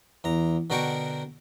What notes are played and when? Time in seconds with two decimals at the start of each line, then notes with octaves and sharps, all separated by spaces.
0.24 E2 A#5
0.70 B2 D3 F#4 A#4 G5 C#6